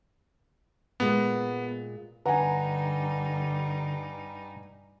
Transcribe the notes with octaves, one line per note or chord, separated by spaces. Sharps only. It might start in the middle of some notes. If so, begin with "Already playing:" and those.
A#2 G#3 B3
G2 D3 G3 D#4 B4 F#5 G#5 A#5